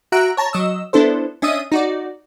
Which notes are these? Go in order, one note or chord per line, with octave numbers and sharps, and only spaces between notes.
F#4 E5 A#5 F#6 D7
C#5 A5 A#5
F#3 D#5 E6
B3 D4 E4 A4 C5
C#4 D4 D#5 E5 D#6 D#7
D#4 F#4 D5